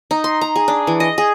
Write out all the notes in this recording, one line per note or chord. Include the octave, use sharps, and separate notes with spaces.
D#4
C6
A#5
G#4
D4
E3
D#5
G#4